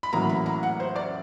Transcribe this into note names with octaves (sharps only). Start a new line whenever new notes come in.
B5
A1 A2 F#3 A#3 A#5
B5
A#5
F#5
C5
D5